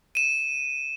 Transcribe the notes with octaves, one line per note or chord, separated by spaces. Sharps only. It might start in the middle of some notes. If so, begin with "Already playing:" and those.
D#7 E7